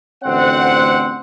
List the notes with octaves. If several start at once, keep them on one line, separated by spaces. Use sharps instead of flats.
A1 D2 C4 C5 F#5